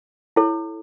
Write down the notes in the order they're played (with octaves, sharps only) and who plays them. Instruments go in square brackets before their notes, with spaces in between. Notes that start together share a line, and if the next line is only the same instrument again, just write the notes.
[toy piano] E4 A4 C#5